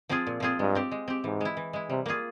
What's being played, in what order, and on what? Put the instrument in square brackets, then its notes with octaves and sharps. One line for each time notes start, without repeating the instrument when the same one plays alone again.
[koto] F3 C4 F4 G#4
A#2
F3 C4 F4 G#4
[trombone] G2 [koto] G#3
[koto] C4 G4
G#3
C4 G4
[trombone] G#2 [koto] E3
[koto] G#3 E4
E3
G#3 E4
[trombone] C3 [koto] G3
[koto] A#3 F4 G#4